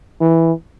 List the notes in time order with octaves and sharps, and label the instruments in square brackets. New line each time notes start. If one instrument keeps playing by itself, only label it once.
[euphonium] E3